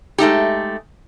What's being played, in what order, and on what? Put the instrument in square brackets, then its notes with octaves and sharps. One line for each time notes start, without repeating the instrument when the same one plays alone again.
[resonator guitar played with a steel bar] G#3 A3 D#4 G4